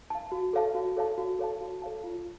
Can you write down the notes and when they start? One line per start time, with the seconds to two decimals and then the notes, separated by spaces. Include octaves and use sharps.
0.10 F5 A5
0.32 F#4
0.53 A4 C#5 F5 A5
0.75 F#4
0.97 A4 C#5 F5 A5
1.18 F#4
1.39 A4 C#5 F5 A5
1.61 F#4
1.82 A4 C#5 F5 A5
2.04 F4